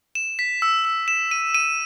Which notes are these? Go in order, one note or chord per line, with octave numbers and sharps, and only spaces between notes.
E7
B6
E6
E6
E7
D#7
D#7